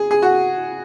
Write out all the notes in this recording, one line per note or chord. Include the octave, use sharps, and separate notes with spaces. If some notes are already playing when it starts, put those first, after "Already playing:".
Already playing: G#4
G#4
F#4